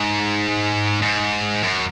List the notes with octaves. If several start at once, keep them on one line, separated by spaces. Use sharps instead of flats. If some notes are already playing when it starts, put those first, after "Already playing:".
Already playing: G#2
G#2
F#2